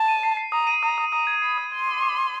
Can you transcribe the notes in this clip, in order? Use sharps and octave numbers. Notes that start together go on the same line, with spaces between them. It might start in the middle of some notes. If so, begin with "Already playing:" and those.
Already playing: A5
D#7
C7
C7
A#5 D#6
D#7
A#5 D#6
D#6
A#5 D#6
G#6
B5 C7
D#6
C6 G#6
D6
D6
D6